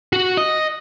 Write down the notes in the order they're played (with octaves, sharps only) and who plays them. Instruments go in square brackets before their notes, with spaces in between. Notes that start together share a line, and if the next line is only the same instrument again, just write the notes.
[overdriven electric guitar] F#4
D#5